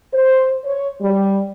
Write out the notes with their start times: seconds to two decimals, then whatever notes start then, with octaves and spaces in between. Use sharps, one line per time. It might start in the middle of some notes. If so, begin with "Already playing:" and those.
0.13 C5
0.65 C#5
1.01 G3